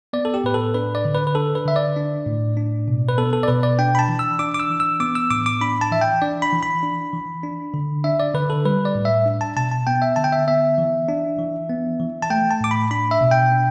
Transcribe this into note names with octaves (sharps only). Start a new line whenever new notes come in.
B3 D5
A4
G4
A2 B4
A4
D4 B4
D5
D3
B4
B4
D4 A4
B4
D3 E5
D5
D4
A2
D4
B2
B4
B3 A4
A4
D5
B2 B4
D5
D4 G5
B5
A5
E3
E6
D4 D6
D6
E6
E3
E6
B3 D6
E6
A2 D6
D6
D4 B5
A5
E3 E5
G5
D4 D5
B5
E3
B5
D4
E3
D4
D3
D4 E5
D5
D3 B4
A4
G3 B4
D5
A2
E5
D4
A5
B2 A5
A5
B3 G5
E5
D3 A5
G5
E5
B3 E5
E3
D4
E3
B3
E3
A5
A3 G5
A5
A2 D6
B5
D4 B5
E5
B2
G5
D4